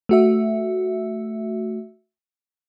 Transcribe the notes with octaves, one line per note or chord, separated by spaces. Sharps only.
A3 F#4 E5